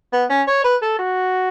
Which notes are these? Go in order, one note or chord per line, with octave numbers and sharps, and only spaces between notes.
B3
C#4
C#5
B4
A4
F#4